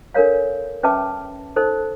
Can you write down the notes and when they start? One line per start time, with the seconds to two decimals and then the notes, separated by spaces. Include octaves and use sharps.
0.14 D4 A4 A#4 C#5 F5
0.83 C#4 B4 E5 G5 A5 D6
1.56 D#4 A4 C5